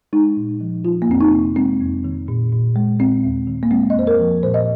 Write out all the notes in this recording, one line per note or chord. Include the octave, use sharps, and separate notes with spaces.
G#3 D#4
A#2
F3
F3 F4
A#3
F2 C4
D#4
C3
G#3 C4
F2
D#3
A#2
A#2
G#3
G#3 C4
D#2
D#3
A#3
G#3 C4
D#5
F2 C5
A#4
F3
A#2 C5
D#5